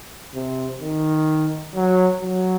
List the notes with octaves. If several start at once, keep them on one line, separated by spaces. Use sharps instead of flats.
C3
D#3
F#3
F#3